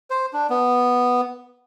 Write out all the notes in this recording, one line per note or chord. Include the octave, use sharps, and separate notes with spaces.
C5
D4
B3